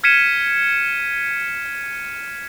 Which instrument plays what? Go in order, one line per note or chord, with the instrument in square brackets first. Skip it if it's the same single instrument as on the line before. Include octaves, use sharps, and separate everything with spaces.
[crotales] F6 G#6 B6 C#7 D#7 E7